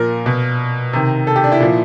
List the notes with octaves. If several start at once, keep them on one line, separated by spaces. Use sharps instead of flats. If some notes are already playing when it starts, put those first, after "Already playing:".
Already playing: A#2 F3 A#4
B2
C3 D#3
A4
G4
D4
E4
A#2 F3